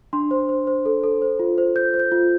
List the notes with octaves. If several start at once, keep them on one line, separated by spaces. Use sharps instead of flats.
D4 C6
C5
C5
C5
A4
A4
C5
F4
C5
C5 G6
C5
G6
F4